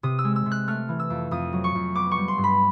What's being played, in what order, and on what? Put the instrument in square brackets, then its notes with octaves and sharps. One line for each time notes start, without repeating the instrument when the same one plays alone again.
[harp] C3 D#6
E6
G#3
E6
C3
F#6
A3 F6
E3
E6
F2
F2 D#6
F#3
C#6
F2
B3 D6
C#6
G3
C6
G2
B5